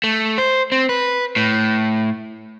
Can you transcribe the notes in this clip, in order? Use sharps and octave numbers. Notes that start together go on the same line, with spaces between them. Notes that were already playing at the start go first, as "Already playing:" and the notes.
A3
C5
C4
B4
A2